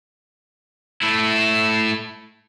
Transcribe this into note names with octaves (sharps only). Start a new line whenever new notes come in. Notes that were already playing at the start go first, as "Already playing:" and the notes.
A3 E4